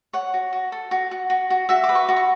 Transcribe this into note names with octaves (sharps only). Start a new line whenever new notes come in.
C#5 F#5
F#4
F#4
A4
F#4
F#4
F#4
F#4
F#4 E5
D6
B4
C#6
F#4
C#6